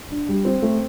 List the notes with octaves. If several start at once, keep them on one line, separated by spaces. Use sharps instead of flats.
D4
G3
C4
A3